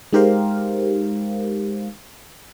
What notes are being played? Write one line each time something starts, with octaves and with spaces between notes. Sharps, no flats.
G#3 D#4 G4 A#4 C5 F5